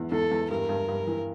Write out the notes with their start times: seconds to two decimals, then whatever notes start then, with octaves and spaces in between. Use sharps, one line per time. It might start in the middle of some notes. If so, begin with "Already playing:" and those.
Already playing: E2 B3
0.11 E2 A4
0.31 E2
0.50 G2 A#4
0.69 G2
0.88 G2
1.07 E3